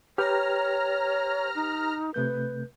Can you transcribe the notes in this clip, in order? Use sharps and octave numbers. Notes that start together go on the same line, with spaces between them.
G4 B4 C#5 G5 A#5 F6
D#4
C3 A3 B4 G6